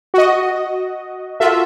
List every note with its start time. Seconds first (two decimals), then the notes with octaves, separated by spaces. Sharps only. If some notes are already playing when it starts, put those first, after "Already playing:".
0.14 F#4 D#5
1.40 F4 F#4 A4 E5